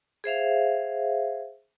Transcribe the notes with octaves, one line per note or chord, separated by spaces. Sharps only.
G#4 C5 E5 F5